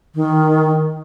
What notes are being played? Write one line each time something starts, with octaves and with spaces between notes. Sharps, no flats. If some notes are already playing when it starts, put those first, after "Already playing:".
D#3